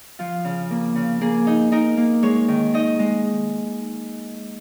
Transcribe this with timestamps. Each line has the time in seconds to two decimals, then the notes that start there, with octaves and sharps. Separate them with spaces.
0.19 F3 F4
0.45 C#3
0.71 A#3
0.95 C#3
1.21 A#3 G#4
1.47 D#4
1.72 D#4 A#4
1.97 A#3
2.23 G#3 C#5
2.48 D#3
2.74 D#4 D#5
2.99 G#3